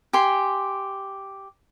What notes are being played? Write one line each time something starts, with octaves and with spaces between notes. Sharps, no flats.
G4 G#5 C6